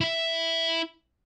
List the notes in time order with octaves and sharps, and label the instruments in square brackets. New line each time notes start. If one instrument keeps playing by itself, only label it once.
[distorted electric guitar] E4 E5